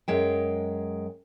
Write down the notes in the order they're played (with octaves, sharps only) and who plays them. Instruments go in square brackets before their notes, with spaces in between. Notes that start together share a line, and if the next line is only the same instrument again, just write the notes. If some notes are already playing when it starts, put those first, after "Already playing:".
[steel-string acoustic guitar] F#2 G#3 G5